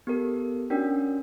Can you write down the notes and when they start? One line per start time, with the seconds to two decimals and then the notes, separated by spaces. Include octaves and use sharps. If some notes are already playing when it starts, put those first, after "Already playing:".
0.07 B3 G4 A4 A#4
0.70 C#4 D4 F#4 A#4 G5